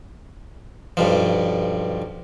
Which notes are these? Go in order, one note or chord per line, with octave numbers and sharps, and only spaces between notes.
B1 G2 F3